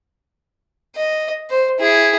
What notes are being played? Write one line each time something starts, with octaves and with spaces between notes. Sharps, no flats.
D#5
C5
E4 G#4